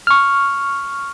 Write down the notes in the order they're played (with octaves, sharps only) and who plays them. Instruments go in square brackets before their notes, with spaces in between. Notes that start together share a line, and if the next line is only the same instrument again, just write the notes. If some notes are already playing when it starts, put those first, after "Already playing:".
[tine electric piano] C#6 F6